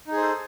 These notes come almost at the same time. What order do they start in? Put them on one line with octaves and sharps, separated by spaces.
D#4 G#4 C5 A4